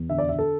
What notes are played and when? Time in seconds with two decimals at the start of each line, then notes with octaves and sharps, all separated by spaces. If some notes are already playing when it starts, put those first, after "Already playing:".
Already playing: E2
0.10 D3 E5
0.18 D5
0.29 E5
0.31 D3
0.39 A4